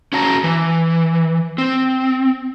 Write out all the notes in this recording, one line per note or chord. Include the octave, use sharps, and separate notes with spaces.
C#4 F#4 A5 A#5
E3
C4